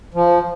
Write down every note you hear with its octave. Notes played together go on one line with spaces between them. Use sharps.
F3